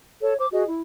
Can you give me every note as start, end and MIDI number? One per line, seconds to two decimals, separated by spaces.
0.21 0.35 69
0.21 0.35 73
0.38 0.47 72
0.38 0.47 86
0.53 0.64 66
0.53 0.64 68
0.53 0.64 75
0.67 0.81 64